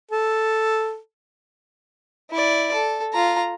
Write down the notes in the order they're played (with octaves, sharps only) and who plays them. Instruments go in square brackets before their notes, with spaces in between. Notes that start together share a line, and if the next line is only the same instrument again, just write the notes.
[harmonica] A4
[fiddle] E4 D5
A4
F4 A#5